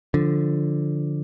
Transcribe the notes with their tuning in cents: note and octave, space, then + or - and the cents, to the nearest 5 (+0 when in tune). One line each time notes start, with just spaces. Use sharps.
D3 +0 F3 +0